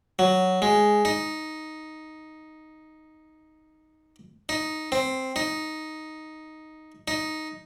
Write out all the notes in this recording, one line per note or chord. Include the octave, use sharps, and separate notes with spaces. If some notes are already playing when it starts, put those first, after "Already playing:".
F#3
G#3
D#4
D#4
C4
D#4
D#4